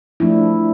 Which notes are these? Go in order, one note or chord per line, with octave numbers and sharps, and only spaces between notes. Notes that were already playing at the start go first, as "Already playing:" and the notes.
F3 A3 D4 E4